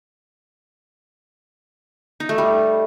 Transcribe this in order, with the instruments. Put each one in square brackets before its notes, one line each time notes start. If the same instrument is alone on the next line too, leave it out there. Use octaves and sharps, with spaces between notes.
[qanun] D#4
A3
G3